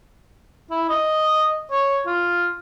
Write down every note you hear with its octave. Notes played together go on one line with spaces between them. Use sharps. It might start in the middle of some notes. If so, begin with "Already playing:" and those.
E4
D#5
C#5
F4